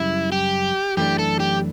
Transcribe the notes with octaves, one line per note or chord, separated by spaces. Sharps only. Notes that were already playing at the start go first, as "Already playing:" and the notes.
Already playing: F#2 C#3 G3 E4
G4
F#2 E3 A3 D4 G4
A4
G4